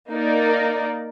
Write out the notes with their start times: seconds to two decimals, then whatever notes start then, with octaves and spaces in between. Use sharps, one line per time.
0.11 A#3 D#4 A#4 D5